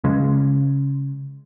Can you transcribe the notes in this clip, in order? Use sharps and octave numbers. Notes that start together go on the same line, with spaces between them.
C#3 G#3